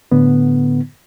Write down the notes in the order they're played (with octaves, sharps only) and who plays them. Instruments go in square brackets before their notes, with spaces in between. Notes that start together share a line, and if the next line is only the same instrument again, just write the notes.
[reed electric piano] A2 D3 B3